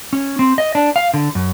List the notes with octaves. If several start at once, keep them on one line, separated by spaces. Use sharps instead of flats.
C#4
C4
D#5
D4
F5
D3
F#2